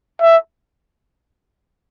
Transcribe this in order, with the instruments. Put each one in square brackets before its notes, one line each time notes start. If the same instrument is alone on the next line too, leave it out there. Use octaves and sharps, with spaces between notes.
[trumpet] E5